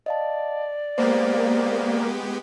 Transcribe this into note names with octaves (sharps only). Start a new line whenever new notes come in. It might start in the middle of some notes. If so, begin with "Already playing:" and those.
D5 D#5 F5 A5
G#3 A#3 B3 G4 C5